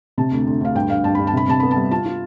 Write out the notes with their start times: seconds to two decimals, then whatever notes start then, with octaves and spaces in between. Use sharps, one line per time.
0.18 C3 A5
0.31 D2
0.47 D2
0.61 D2 F5
0.75 G2 G5
0.90 G2 F5
1.04 G2 A5
1.15 G2 B5
1.27 A5
1.33 C3 B5
1.48 C3 A5
1.60 B3 B5
1.71 A5
1.76 G3
1.91 F4 A5
2.06 F4